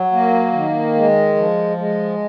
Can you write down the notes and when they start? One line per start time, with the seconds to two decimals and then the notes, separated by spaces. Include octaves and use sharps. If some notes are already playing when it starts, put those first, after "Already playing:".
Already playing: F#3
0.12 A#3
0.53 D#3
0.95 G#3
1.36 F3
1.77 G#3